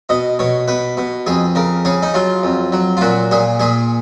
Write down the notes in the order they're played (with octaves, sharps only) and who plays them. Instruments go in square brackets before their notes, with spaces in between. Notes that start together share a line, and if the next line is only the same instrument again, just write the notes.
[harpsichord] B2 D#5
B2 C#5
B2 B4
B2
F2 G#4
C#3 A#4
C#3 G#4
D#4
F#3 F4
F2
F#3
F4
A#2 F#4
A#2 G#4
A#2 G#4